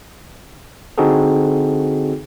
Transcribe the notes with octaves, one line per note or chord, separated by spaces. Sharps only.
D3 C4 D#4 F#4 G#4 A4